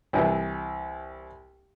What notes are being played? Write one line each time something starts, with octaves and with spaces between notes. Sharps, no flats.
C2 E3